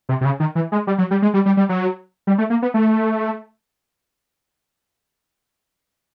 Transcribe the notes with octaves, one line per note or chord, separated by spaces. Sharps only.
C3
C3
C#3
D#3
E3
G#3
G3
F#3
G3
G#3
G3
G3
G3
F#3
G3
A3
A#3
B3
A3